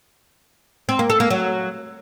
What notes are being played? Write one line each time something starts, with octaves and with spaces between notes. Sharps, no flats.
C4
A#3
A4
A#3
F#3